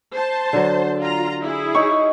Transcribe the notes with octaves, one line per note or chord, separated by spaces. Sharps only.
C5 A5
D3 F#3
F4 A#5
E4 G#4
D#4 C#5 C#6